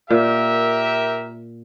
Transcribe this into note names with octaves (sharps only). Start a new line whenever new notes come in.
A#2 G4 A#4 E5